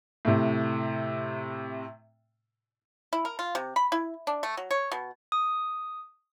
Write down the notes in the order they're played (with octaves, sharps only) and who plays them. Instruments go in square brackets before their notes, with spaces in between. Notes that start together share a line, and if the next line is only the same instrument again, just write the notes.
[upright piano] A2 C3
[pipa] E4
A#4
F4
C3
B5
E4
D4
A3
F#3
C#5
B2
[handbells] D#6